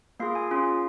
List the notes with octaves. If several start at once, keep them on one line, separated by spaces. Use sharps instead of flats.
A#3 F4 G#4 F5
G#5
C#4 F4 G#4 F5